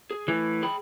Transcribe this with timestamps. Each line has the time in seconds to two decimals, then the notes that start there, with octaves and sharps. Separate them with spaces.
0.11 G#4
0.28 A2 E3
0.63 G#4 G5 B5